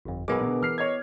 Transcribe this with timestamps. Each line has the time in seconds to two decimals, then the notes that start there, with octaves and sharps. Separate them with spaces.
0.05 G1 F2
0.28 B1 G#3 B3 G#4 A#4 B4 D6
0.40 B2 D3
0.63 E3 F6 C7
0.78 C#5 D#5 G#6